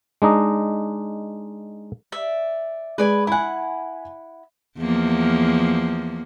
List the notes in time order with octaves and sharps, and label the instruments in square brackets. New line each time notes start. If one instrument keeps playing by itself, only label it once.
[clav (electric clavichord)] G#3 D4 D#4 D#5
[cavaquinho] D5 E5
[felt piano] G#3 [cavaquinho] B4 D5 G#5
[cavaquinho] E4 F#5 [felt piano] G#5 B5
[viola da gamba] E2 F3 A#3